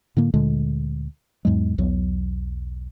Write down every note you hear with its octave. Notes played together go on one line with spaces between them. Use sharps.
A2 D3 A#3
D2 A#2 D3 G#3
E2 G#2 F#3 G#3
B1 E2 F#3